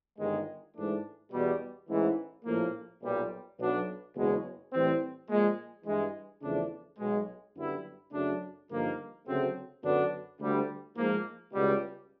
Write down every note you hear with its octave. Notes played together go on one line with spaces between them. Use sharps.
G1 G2 D#3 G#3
G#2 E3 A3 D4
E2 B2 G3
A1 G#2 E3
A#1 A2 F3 A#3
B1 A#2 G3
B1 B2 F#3 B3 D4
F#1 E2 B2 G#3 C#4
A2 E3 G3 C4
A#2 F3 G#3
G2 E3 G#3
E2 C#3 F3 A3 D4
B1 B2 G#3
F#2 D3 G3 B3 E4
F#2 C#3 F#3 A3 D4
G2 D3 F3 A#3 D#4
D2 C#3 F#3 A3 C4
F#2 D3 F#3 B3 D4
D2 D3 G3
G#2 F3 A#3
C#2 B2 G3